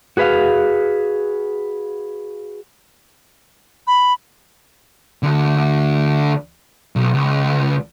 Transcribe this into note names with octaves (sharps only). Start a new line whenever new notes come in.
F#4 G#4 B4 E5 F5
B5
D2 D3
B1
C#2